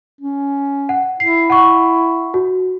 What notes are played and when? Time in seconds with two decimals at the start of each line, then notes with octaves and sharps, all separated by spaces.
0.21 C#4
0.89 F#5
1.20 E4 C7
1.50 F#5 C#6
2.34 F#4